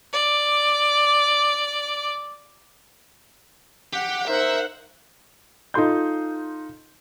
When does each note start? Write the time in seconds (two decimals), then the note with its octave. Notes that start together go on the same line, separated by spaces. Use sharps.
0.13 D5 D6
3.93 G4 F#5
4.27 D#4 A#4 C5 E5 F#5
5.74 D#4 F4 A4 C6 G6